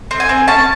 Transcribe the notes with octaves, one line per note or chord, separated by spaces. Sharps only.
C4
G#5
C4
C#4 A5